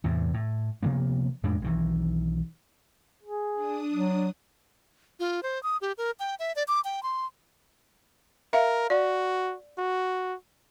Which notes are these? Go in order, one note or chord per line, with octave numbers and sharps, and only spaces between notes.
E2 A2 C3
A2
C3 F3 A#3 B3
F2 A2 G#3 D4
B1 D#3 E3
G#4
D4 D#6
F#3
F4
C5
D#6
G4
A#4
G5
E5
D5
D6
G5
C6
A#4 E5 F5
F#4 D5
F#4